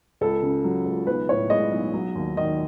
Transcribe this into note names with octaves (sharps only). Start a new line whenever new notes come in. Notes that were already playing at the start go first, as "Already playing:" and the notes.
C#2 A4
C#3
F#3
C#2
B1 B4
A2 C#5
G#3 D#5
B1
F#3
D#2
D#3 D#5